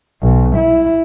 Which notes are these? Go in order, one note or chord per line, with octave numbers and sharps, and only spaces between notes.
B1
E4